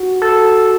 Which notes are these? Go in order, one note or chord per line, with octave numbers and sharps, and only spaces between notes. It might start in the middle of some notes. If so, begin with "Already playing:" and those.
Already playing: F#4
A4